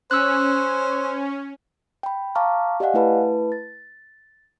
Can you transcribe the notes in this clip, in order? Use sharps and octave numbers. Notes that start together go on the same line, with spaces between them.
C#4 C5 E6 F#6
G5 B5
F5 A5 A#5 C#6 D6 F6
G4 D5 D#5 F5 F#5 G#5
A3 E4 B4 A5 B5
A6